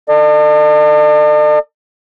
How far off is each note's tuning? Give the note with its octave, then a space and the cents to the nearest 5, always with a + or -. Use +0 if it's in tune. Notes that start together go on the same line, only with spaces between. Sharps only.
A4 +30 D5 +45